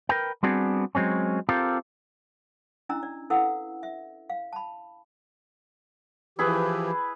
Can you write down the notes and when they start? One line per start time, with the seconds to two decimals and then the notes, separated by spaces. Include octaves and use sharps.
0.09 A#4 B4 G5
0.43 G3 B3 C4 D4 F#4 G#4
0.95 F#3 G#3 C4 C#4
1.49 C4 F4 G4 A4 A#4
2.89 C#4 D4 E4 D#5 A#5 E6
3.03 D5
3.30 E4 A4 B4 F5 F#5 E6
3.83 E5
4.30 F5
4.53 A5 B5
6.39 E3 F3 E4 G4 G#4 B4